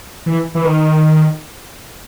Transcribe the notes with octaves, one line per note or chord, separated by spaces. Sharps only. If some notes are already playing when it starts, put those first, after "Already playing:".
E3
E3
D#3